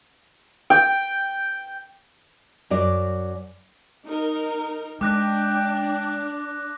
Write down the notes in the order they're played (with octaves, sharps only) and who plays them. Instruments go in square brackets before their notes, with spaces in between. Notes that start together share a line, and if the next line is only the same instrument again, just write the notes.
[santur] G5
[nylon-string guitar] F#2 F#3 D5
[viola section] D#4 A#4
[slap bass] G#3 [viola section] D4 [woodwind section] G5 [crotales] D6 F#6 A#6